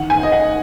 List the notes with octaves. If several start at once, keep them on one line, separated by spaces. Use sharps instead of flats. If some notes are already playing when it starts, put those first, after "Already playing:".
Already playing: D#3 F#5
G#5
D#5
D#4 F#5